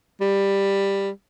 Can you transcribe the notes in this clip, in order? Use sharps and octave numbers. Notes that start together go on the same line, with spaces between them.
G3